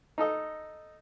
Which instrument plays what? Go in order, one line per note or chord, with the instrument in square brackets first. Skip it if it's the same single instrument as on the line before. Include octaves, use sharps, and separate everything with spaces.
[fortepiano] D#4 A4 D#5